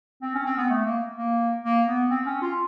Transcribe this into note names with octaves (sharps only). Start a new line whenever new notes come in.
C4
C#4
C4
B3
A3
A#3
A#3
A#3
B3
C4
C#4
F4